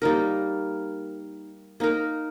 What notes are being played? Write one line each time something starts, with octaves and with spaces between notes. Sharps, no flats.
G3 A#3 D#4 A#4
A#3 D#4 A#4